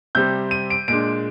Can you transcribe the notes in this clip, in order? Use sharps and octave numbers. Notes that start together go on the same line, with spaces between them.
C3 G3 C4 G6
D#7
D7
A#2 G#3 D4 D7